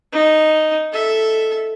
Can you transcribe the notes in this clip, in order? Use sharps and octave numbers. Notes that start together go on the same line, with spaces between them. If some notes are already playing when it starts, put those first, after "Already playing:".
D#4
A4 E5